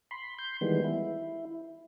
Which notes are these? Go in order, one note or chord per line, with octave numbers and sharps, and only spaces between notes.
B5 C6
C6 G6
D#3 E3 G3 G#3 B3
E4